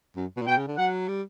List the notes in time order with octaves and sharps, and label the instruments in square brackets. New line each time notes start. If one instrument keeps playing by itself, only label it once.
[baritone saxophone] F#2
B2
A#2
[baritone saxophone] B2 [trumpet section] G5
[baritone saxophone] C#3
D3
[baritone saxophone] F#3 [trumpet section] F#5
[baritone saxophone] G3